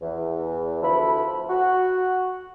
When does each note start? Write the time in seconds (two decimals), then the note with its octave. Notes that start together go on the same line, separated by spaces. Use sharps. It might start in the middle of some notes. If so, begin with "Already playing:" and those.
0.01 E2
0.81 D2 F3 E4 A4 B5
1.49 F#4 F#5